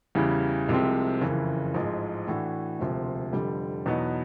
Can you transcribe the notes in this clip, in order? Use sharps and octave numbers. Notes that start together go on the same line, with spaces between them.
E2 C#3 E3 G3
C2 C3 F3 G#3 C4
F#1 F2 C#3 E3
A1 G#2 F3 G#3
A2 E3 A3 D4 F#4
E1 D2 C3 F3
F1 F2 D3 G3
E2 B2 F#3 B3 D#4